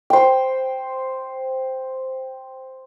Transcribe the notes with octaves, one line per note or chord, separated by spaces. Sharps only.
C5 G5